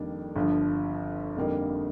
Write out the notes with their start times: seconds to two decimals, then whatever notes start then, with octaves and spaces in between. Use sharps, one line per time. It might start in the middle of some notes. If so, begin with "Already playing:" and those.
Already playing: F2 D#3 G3 A#3 D4
0.36 G1 G2 F3
1.36 F2 D3 G3 A#3 D#4